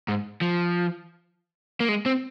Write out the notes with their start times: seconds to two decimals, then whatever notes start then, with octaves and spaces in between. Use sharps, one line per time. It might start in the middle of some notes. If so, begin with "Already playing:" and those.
0.08 G#2
0.41 F3
1.80 A#3
1.89 G#3
2.06 C4